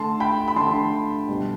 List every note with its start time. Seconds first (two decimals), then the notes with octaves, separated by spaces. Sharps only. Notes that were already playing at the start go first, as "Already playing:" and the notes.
Already playing: D3 A3 A5 C6
0.20 G5 B5
0.48 B5
0.56 D3 A3 A5 C6
1.28 B2 G3